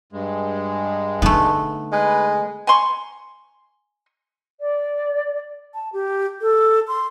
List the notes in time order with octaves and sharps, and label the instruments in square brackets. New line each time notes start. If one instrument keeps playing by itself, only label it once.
[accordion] G2 G#3
[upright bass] D3 D#4 [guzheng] A3 B3
[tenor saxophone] G#3 [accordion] B4
[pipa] G#5 A#5 C6 C#6
[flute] D5
A5
G4
A4
C6